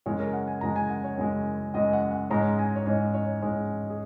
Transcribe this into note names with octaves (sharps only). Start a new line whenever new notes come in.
F#2 C#3 G#3 C#5
A#4
F#5
G#5
F#2 C#3 G#3 A#5
G#5
F#5
C#5
F#2 C#3 G#3
F#2 C#3 G#3 D#5
F#5
F#5
G#2 G#3 C#4 A#5
G#5
C#5
G#2 G#3 C#4 D#5
C#5
G#2 G#3 C#4
G#4